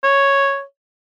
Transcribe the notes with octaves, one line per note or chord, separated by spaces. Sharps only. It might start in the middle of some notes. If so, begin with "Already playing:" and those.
C#5